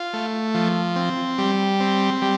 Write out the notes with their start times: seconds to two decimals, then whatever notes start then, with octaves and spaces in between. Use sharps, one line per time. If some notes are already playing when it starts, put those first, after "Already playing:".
Already playing: F4
0.13 A3
0.54 F3
0.96 C4
1.38 G3
1.80 C4
2.22 G3